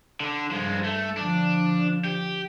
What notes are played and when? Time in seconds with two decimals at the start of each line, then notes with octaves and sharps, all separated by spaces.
0.20 D3 D4
0.51 G2 F3 G#3
0.84 A3
1.17 D3 F3 D4
2.04 G4